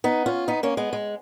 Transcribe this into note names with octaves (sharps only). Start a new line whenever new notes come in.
B3 D#4
C#4 F4
B3 D#4
A#3 C#4
G#3 B3
G#3